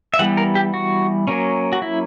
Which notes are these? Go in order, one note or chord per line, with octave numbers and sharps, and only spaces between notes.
E5
E3 G3 B3 F#5
A#4
G4
F#4
F#3 A#3 C#4
F#4
E4